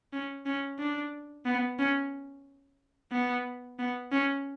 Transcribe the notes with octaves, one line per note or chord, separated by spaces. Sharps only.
C#4
C#4
D4
B3
C#4
B3
B3
C#4